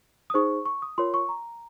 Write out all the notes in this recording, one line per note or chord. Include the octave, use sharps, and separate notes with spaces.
D#6
D#4 G#4 C5 C#6
C#6
D#6
F4 A#4 C#5 C6
C#6
A#5